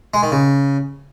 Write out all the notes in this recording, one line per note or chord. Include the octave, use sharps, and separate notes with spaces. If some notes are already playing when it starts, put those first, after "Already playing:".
G#3
D#3
C#3